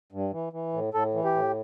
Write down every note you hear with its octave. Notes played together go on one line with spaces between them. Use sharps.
G2
E3
E3
A2
A2 A4
E3
G4
A2